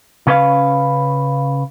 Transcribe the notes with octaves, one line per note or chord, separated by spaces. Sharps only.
C#3 C#4 B4 C5 F5